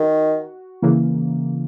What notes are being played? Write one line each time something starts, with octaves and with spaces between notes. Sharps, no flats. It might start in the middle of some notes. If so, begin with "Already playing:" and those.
Already playing: D#3 F#4
C#3 E3 A#3